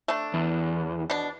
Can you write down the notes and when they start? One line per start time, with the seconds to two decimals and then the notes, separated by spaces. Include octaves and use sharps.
0.08 A3 D4
0.34 E2
1.10 B2 D4